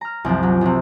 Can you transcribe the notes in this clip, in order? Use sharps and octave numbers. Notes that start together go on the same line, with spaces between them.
A#5 F6
C2 F#2 F3
F#3
C2 C3